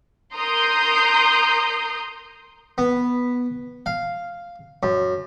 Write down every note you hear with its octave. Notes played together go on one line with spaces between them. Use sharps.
A#4 A#5 C6 D#6 G6 C7
B3
F5
F#2